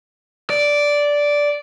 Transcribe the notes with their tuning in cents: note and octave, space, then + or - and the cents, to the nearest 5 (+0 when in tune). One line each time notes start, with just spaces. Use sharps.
D5 -5